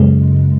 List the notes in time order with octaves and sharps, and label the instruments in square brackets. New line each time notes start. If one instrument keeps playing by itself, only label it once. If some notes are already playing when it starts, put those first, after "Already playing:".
Already playing: [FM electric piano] F#2 C#3 G#3